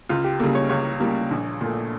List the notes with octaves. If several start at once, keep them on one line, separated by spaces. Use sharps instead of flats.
C#2 F4
G4
C#3 G3 A#3 A4
C#5
C#2 C#5
C#3 G3 A#3
A#1
A#2 A3